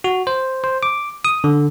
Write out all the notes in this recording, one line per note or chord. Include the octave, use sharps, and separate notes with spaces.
F#4
C5
C5
D6
D#6
D3